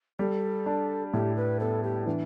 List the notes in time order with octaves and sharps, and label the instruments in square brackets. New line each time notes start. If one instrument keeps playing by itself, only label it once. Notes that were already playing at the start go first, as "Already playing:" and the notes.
[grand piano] G3 [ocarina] A4
[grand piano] D4
[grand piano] A2 [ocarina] G4
[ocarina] B4
[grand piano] B3 [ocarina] A4
[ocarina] G4
[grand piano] E3 [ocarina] D4